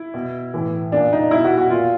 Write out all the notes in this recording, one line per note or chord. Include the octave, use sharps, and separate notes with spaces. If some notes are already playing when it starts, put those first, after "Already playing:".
Already playing: E4
B2
A2 E3
A#2 D4
D#4
B2 E4
F#4
F#4
A#2 F4